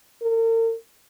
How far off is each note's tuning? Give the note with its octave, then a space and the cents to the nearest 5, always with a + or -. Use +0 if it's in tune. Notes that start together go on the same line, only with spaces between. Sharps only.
A#4 -40